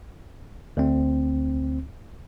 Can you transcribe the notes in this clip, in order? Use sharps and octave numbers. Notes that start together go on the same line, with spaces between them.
D2 C4